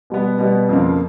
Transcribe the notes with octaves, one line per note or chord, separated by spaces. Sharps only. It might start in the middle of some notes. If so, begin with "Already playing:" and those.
B2 G3 B3
B2 G3 B3
F2 C#3 F3 A#3